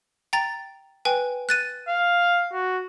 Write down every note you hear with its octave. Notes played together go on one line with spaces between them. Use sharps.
G5 A#5 A6
B4 G5 G#5
F#6 A6 D#7
F5
F#4